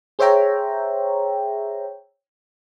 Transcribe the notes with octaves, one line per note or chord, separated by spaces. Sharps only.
G#4 C5 C#5 E5 G5 A#5